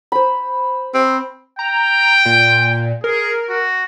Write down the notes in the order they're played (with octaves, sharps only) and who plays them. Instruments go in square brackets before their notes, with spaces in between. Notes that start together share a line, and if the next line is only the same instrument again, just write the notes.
[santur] C5 B5
[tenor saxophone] C4
[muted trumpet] G5 [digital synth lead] A#5
[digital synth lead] A#2
[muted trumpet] G#4 [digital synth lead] A#4
[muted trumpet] F#4